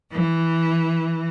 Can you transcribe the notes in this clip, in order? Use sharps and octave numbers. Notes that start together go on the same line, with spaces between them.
E3